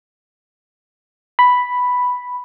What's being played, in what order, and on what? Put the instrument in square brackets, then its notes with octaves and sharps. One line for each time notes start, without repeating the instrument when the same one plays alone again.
[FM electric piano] B5